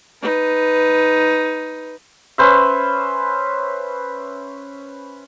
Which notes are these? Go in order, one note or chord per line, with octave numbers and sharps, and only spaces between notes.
D#4 B4
C#4 B4 C5 E5